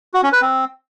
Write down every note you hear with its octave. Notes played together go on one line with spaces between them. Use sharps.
F#4
C#4
B4
C4